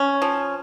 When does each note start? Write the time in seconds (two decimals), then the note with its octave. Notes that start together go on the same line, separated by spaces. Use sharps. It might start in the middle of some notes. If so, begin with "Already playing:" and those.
Already playing: C#4
0.22 F3